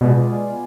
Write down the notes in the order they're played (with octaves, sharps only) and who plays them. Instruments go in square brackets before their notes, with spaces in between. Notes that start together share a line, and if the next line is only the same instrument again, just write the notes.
[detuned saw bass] B2 [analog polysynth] G#3 B3 F4 G#4 D5